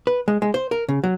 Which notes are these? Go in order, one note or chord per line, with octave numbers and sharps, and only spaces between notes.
B4
G#3
G#3
C5
A#4
C#3
F#3